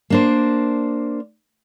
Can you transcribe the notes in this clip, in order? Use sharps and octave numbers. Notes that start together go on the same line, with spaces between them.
A#3 D4 C5